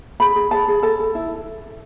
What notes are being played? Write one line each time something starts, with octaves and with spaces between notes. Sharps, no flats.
G#4 B5
G#4
G#4 A5
G#4
A4 A5
A4
E4